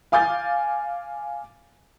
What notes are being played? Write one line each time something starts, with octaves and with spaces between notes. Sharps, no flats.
F5 G#5 D6 G6 A6